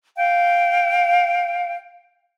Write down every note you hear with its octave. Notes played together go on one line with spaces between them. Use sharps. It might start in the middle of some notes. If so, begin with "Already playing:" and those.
F5 G5